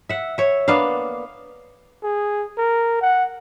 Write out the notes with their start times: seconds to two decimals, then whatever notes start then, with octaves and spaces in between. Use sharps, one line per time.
0.09 E5 F#5
0.38 C#5 E5
0.68 A#3 B3 D4 F5
2.03 G#4
2.58 A#4
3.01 F#5